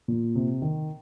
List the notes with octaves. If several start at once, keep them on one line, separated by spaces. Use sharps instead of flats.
A#2
C3
D#3